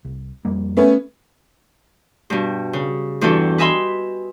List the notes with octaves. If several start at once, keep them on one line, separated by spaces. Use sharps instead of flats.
C2
F2 G3 A#3
A3 B3 C#4
G2 B2
C#3
E2 G2 E3 B3 F#4 A4
B4 D#5 E5 G#5 B5 C6